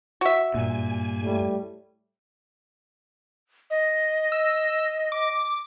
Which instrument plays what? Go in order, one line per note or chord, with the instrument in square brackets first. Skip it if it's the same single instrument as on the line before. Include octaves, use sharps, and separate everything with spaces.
[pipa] F#4 E5
[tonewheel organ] G2 G#5 [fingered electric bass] A#2
[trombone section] A2 G3 A3
[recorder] D#5
[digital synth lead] E6
D6